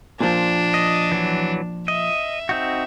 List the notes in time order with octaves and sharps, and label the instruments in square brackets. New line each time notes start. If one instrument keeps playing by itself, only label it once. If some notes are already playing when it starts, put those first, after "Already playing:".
[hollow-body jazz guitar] A#2 F3 [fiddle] D4
[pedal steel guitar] D#5
E3 F#3
[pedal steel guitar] D#5 [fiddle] E5
[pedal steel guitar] C4 D#4 F#4